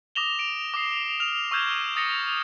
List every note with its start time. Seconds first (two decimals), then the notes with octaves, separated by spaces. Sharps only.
0.15 D6 D#6 A#6 E7 F7 G7
0.39 D7
0.74 D6 D#6 C7
1.20 F6 F7
1.51 C#6 E6 F6 G6 G#6 E7
1.96 D#6 A6 A#6 C#7